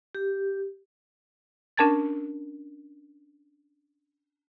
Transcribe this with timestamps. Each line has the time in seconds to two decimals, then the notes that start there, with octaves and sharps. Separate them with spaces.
0.15 G4
1.77 C#4 D4 A#4 A5 G#6 A6